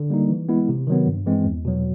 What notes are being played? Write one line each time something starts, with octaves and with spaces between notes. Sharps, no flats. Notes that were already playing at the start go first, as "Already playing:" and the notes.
Already playing: D3
G3 A#3 D#4
E3
G#3 B3 E4
C3
D#3 F#3 B3
G2
E3 G#3 C4
E2
B2 F#3